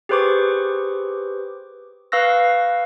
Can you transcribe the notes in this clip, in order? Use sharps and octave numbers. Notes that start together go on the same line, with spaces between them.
G4 G#4 B4 C5 C#6 D6
B4 F5 C#6 E6 F#6 A#6